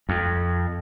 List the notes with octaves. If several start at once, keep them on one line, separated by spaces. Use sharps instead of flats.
F2